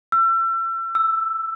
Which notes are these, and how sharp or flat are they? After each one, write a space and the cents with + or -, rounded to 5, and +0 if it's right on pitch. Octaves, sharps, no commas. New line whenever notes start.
E6 +35
E6 +5